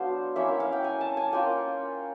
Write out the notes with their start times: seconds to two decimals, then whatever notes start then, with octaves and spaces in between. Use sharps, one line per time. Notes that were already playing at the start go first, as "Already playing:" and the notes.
Already playing: F#3 B3 D4 C5 F5
0.36 A#3 C#4 E4 E5
0.48 E5
0.60 F5
0.73 G5
0.84 G#5
1.01 A5
1.17 G#5
1.33 A#3 C#4 F4 G5